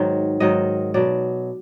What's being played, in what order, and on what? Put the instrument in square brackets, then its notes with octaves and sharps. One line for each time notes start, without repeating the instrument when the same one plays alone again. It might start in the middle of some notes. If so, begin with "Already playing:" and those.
Already playing: [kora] G#2 D#3 F#3
G#2 D#3 F#3 D#5
B2 F#3 D5